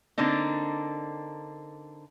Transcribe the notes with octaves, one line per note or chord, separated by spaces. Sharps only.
D3 A#3 C4 D4 D#4